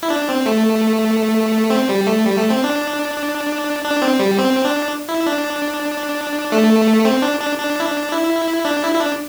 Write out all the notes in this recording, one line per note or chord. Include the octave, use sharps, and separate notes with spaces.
E4
D4
C4
A3
C4
G3
A3
G3
A3
C4
D4
D4
C4
G3
C4
D4
E4
D4
A3
C4
D4
D4
D4
E4
D4
E4
D4
E4
E4
D4